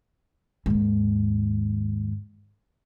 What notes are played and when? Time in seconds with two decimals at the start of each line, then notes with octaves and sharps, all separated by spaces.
0.66 D#2 G#2